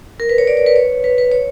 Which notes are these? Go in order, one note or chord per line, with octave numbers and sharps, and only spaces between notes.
A#4
B4
C#5
D5
C#5
B4
C#5
B4
B4
C#5